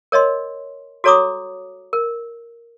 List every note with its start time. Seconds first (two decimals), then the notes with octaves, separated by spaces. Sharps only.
0.12 A#4 C#5 D#5 C6
1.04 F#4 A4 C#5 A#5 D6 D#6
1.93 A#4